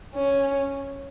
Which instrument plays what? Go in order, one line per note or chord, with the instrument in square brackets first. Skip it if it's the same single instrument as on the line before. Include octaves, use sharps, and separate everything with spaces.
[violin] C#4